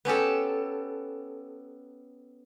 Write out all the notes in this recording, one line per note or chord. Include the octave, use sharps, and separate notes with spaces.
B3 C#4 G4 A4